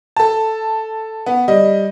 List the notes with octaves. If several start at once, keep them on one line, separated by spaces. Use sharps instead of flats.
A4 A5
B3
G3 D#5